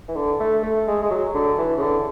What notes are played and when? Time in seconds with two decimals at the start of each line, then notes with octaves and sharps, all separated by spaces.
0.09 E3
0.16 D3
0.40 A3
0.63 A3
0.87 G#3
1.02 G#3
1.11 F#3
1.34 D3
1.58 E3
1.77 C#3
1.81 D3